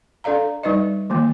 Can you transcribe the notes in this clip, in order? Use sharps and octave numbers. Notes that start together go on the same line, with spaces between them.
D4 A4 D5 F5 A#5
G3 D#4 B4 D5 D#5
D#3 E3 A3 A#3